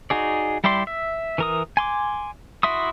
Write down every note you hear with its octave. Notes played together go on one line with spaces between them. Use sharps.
D#4 F#4 G#4 D5
G3 E4 G4 D5 C6
E5
E3 A#4 D#6
G#5 C6 D6
E4 F#4 E5 C6 D#6